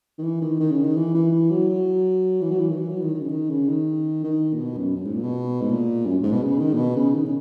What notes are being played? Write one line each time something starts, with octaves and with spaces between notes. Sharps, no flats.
D#3
E3
D#3
D#3
C#3
D#3
E3
E3
E3
F#3
F#3
E3
F#3
E3
D#3
E3
F#3
D#3
D#3
C#3
D#3
C#3
D#3
D#3
A#2
B2
F#2
F#2
G#2
A#2
B2
G#2
A#2
F#2
G#2
B2
C#3
D#3
A#2
B2
C#3
D#3
C#3